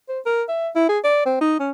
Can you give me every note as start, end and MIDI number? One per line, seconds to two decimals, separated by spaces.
0.09 0.20 72
0.26 0.43 70
0.49 0.69 76
0.75 0.87 64
0.89 0.99 68
1.04 1.25 74
1.26 1.38 60
1.41 1.58 63
1.60 1.71 61